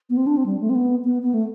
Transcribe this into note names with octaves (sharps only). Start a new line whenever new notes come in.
B3
C4
D4
C4
G3
A3
C4
B3
B3
B3
A3